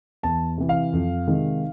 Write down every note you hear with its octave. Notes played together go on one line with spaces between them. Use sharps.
E2 A5
C3 E3
F5
F2
C3 D#3 G#3